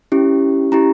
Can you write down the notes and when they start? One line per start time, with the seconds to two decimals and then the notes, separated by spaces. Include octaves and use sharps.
0.12 C#4 E4 G4
0.72 C#4 E4 G4 A#5